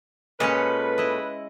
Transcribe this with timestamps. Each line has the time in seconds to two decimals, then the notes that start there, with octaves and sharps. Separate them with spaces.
0.40 A#2 G#3 C#4 A4 B4 C#5
0.98 E4 D#5